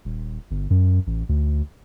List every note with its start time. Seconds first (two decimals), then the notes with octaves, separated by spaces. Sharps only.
0.05 D#1
0.51 G1
0.70 F#2
1.07 A1
1.29 D2